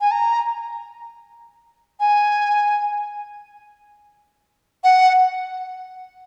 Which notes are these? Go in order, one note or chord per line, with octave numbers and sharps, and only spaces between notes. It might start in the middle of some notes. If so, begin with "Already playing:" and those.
G#5
A#5
G#5
F#5